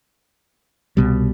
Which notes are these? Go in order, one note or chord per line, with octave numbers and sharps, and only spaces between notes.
C2 B2 G3